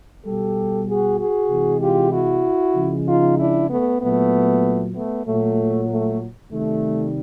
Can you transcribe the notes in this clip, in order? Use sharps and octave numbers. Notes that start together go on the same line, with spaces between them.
B2 G3 G4 A4
F#4 G#4
F#4 G#4
C3 E3 G#3
F4 G4
E4 F#4
C#3 F3 G#3
D#4 F4
D4 E4
A3 B3
A#2 F#3 A3 B3
A3 B3
A#2 F#3 A3
A3
C3 D#3 G3 A3